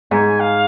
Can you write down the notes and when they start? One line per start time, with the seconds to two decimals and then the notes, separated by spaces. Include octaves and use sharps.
0.11 G#2 G#5
0.40 F5